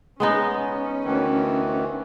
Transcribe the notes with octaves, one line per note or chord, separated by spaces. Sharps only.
G#3 B3 C#4 D#4
D2 D#3 E3